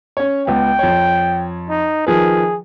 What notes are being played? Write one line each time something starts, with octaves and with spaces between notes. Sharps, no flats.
C#4 C#5
C#2 B3 G5
F2 C#5
D#4
D#3 F3 G#4 B4